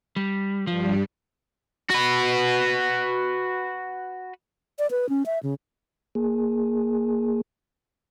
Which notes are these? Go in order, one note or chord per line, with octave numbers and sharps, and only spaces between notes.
G3
G2 F3 G3
F#4 B4
D5
B4
C#4
E5
C#3
A#3 G#4